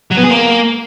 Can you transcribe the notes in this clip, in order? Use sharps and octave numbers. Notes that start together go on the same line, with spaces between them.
F#3
B3
G#4
A#3